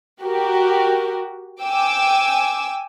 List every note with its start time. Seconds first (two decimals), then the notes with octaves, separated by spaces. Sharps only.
0.22 F#4 G4 A#4
1.62 G5 G#5 D6 E6